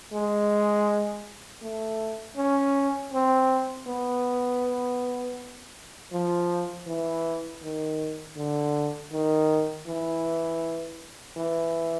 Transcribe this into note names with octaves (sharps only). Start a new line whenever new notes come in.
G#3
A3
C#4
C4
B3
F3
E3
D#3
D3
D#3
E3
E3